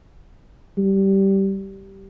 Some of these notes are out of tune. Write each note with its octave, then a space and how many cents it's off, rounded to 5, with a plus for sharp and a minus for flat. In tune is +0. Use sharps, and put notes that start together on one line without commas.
G3 -15